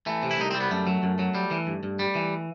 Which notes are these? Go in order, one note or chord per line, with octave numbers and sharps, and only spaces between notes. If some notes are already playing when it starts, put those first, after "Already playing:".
E3 A3
C3
E4
C2 D#4
G3 C4
B3
F#2 A3
F#3
F#2
F#3
G3
E3
G2
G2
G3
E3